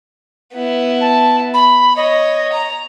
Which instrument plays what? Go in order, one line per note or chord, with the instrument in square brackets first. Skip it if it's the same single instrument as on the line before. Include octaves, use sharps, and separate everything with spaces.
[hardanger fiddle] B3 E4
[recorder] A5
B5
[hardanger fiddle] C#5 [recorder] D#5
[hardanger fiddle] A#5